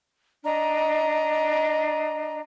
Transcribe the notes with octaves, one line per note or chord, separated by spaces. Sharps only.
D4 D#5 A#5